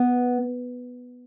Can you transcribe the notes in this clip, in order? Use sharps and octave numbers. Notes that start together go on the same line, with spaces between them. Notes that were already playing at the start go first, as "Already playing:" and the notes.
Already playing: B3